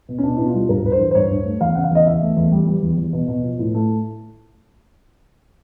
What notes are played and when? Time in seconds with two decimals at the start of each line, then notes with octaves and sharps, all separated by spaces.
0.09 B2
0.18 C#4
0.23 B2 D4
0.36 B2 E4
0.46 F4
0.54 G3
0.69 G2 A#4
0.84 G2 B4
0.92 C5
1.00 E3
1.11 C5
1.15 G2 C#5
1.30 G2
1.45 A3
1.61 E2 F5
1.75 C#3 F#5
1.84 F5
1.91 E2 D#5
2.06 E2 E5
2.22 A3
2.37 E2
2.52 G3
2.67 G3
2.83 E2
2.98 E2
3.13 B2
3.28 B2
3.44 F3
3.59 A2
3.74 A3